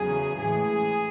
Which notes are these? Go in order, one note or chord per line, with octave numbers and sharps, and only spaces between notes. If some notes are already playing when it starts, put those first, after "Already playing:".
Already playing: E2 C#3 F#3 G#4
A2 E3 G#3 G#4